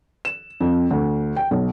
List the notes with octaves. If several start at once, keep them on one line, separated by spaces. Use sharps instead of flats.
E7
F2
D2
G5
B1